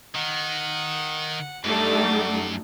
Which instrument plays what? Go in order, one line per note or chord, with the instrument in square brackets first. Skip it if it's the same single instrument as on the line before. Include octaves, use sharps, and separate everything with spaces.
[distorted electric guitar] D#3 [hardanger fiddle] F#5
[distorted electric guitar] F#2 [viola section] G3 A3 D#4 [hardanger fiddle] D4 D6